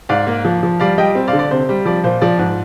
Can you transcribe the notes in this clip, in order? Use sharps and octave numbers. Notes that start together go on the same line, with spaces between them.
G#2 D5 F5
A#3
F3
F3
G3 D5 F5
G3 D#5 G5
C4
D5 F5
D3
D5
C3 C5
G3
F3 D5
A#2 C5
F3 D5
G#2